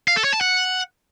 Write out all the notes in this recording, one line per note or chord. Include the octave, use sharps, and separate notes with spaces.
F5
A4
C#5
A5
F#5